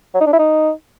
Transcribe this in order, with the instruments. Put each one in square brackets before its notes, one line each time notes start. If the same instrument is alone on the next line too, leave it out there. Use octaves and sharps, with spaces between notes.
[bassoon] F#3
D#4
D4
E4
D#4